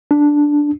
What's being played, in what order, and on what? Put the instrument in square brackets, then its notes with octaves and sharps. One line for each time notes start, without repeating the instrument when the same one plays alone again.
[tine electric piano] D4